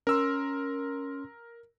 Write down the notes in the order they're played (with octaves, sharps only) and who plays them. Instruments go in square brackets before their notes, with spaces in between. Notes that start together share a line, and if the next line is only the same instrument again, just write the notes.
[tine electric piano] C#4 C6 [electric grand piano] A#4 E6